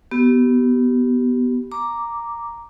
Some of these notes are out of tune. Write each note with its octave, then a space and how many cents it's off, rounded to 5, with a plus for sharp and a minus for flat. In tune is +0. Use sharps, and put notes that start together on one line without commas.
B3 +0 G4 -30
A#5 +0 D6 +0